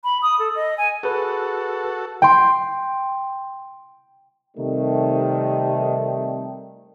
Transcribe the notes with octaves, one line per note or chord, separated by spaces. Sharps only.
B5
D#6
A4
D#5
G#5
F#4 G#4 A4 B4
G5 C6
C3 D#3 G3 A3